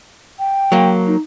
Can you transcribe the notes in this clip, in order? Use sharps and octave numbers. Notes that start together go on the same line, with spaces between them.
G5
F#3 A#3
D#4